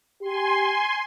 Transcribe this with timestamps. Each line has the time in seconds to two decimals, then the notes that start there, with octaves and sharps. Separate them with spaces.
0.21 G4 G#5 C6